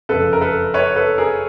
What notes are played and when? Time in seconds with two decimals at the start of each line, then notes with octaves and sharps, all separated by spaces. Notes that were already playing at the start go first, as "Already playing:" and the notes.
0.09 F#1 F2 C#3 A4 B4
0.33 A#4
0.41 A4 B4
0.74 B4 C#5
0.96 A4 B4
1.18 G#4 A#4